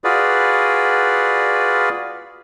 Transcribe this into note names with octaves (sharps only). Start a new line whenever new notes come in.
F4 F#4 G#4 B4 D5